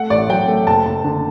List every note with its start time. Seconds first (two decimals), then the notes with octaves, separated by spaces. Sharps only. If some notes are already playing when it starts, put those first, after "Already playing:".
Already playing: A3 F#5
0.10 A1 D5
0.30 F#3 G5
0.48 A3
0.67 F#1 A5
0.85 F#1
1.04 D3